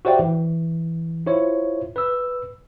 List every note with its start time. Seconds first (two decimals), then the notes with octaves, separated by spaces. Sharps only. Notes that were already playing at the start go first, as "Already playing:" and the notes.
0.05 F#4 G4 C5 D5 E5 G5
0.19 E3
1.26 E4 F4 C5 C#5
1.96 B4 E6